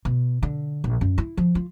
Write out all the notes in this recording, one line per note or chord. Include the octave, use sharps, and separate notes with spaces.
B2
D3
A#1
F#2
E4
F3
F4